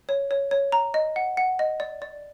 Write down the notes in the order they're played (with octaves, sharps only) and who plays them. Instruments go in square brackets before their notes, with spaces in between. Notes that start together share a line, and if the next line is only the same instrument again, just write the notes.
[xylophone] C#5
C#5
C#5
A#5
D#5
F#5
F#5
D#5
D5
D5